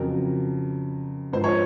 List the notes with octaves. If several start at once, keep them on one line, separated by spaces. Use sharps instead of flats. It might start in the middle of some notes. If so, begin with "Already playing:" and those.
Already playing: F2 C#3 F#3 A#4
G#2 F3 C5
C#5